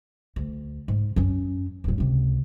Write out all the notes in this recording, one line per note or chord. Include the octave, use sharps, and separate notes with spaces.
D2
G#2
F#2 C#4
D#1 A2
C#2 C3